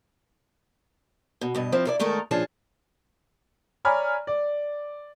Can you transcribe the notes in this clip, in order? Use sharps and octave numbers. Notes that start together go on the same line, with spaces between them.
B2
G2 B2 D#5
F3 C4 E4
E4 A4 D5
D#3 G#3 A3 A4 A#4
A#2 F3 C#4 D4 G#4 A5
C#5 D5 G#5 A#5 B5 F6
D5